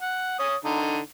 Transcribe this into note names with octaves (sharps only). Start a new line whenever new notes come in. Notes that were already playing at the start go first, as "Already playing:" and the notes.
F#5
C#5 D#6
D3 D#4